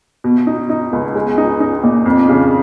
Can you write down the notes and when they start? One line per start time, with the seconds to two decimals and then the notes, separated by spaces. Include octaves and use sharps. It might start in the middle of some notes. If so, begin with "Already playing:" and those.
0.24 B2
0.47 D#4
0.69 D#4
0.93 C#2
1.15 G#3
1.38 D#4
1.61 D#4
1.84 A#2
2.06 F2
2.29 C#3